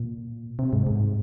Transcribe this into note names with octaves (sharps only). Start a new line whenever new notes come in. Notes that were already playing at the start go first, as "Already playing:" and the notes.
Already playing: A#2
C3
G#2
G#2